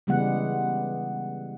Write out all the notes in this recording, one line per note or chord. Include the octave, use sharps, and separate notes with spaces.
C#3 E3 G3 G#3 B3 F#5